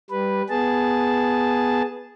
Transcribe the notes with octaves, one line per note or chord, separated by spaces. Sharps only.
G3 B4
B3 G#4 A5